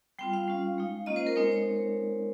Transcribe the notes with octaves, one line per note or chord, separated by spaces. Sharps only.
G3 C4 F4 G5
F5
G3 C#4 F4
G#3 D#4
A#3 C#4 F4 D#5
C5
A#4
G#3 C4 D#4 C5
C#5